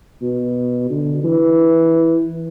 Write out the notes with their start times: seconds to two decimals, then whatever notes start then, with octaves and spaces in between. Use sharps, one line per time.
0.22 B2
0.90 D3
1.24 E3